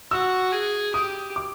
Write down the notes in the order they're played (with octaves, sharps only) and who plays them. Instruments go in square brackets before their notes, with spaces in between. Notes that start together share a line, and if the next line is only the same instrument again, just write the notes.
[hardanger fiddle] F#4 [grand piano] E6
[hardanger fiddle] G#4
[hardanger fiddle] G4 [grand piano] D#6
[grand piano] D6